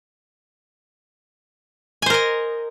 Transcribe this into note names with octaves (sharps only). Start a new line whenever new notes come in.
A#4 C5 D#5 G#5